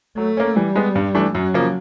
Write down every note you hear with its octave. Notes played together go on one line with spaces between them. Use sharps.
F#3 A3
A#3 C#4
E3 G3
G#3 B3
G2
E3 A3 D4
F#2 F#3
C#3 F3 A#3